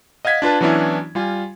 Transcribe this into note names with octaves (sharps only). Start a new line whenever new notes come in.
D#5 F5 F#5 G#6 B6
D4 F4 B4 A5
E3 F#3 B3 C#4 D4 E4
G3 F4 G#5